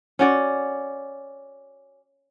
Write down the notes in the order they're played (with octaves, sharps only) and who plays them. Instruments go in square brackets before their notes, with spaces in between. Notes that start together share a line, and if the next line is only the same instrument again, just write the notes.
[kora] C#4 F#4 D5